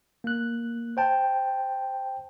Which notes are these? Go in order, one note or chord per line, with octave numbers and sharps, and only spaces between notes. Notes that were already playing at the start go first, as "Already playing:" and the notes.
A#3 F#6
C5 G5 A5